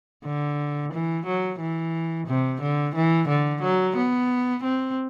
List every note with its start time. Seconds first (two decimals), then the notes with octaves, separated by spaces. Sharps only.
0.25 D3
0.93 E3
1.26 F#3
1.60 E3
2.28 C3
2.62 D3
2.96 E3
3.29 D3
3.62 F#3
3.97 B3
4.64 C4